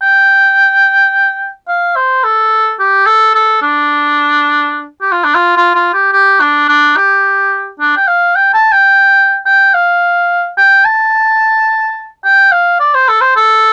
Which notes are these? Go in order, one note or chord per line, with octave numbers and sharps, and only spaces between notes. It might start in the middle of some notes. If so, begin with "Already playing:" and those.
G5
F5
C5
A4
G4
A4
A4
D4
G4
F4
D4
F4
F4
F4
G4
G4
D4
D4
G4
D4
G5
F5
G5
A5
G5
G5
F5
G5
A5
G5
F5
D5
C5
A4
C5
A4